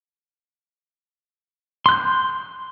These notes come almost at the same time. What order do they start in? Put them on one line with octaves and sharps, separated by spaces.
C6 F#6 G6